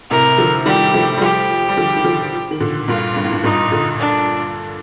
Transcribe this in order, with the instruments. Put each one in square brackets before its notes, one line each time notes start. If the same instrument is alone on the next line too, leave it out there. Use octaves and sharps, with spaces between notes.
[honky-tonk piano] A2 C3 [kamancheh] A#4
[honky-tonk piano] D3 F3
[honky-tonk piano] D#3 G3 [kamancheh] G4
[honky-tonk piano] F3 A3
G3
[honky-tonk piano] F3 A3 [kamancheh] G4
[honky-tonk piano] G3
D3 F3
D#3
D3 F3
D#3
A#2 D3
[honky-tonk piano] G2 A#2 [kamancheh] F4
[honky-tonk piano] G2
A2
G2
[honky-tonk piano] G2 A#2 [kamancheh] D#4
[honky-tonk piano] A#2 D3
[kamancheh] D4